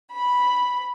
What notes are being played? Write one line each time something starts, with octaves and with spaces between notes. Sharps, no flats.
B5